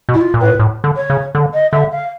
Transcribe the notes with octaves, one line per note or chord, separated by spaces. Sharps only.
B2
E4
F4
A#2
A2 B4
A#2
A2
D3
C#5
C#3
D3
D#5
D3 E5
F5